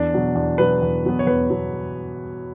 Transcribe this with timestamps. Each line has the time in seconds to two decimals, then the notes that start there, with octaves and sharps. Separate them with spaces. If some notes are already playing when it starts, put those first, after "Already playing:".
Already playing: E2 D4
0.13 B2 F#3 B3
0.35 E2 D4
0.58 B2 F#3 B3 B4
0.82 E2
1.04 B2 F#3 B3
1.19 C#5
1.27 E2 B4
1.50 B2 F#3 B3